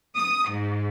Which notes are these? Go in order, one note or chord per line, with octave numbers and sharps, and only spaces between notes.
D#6
G#2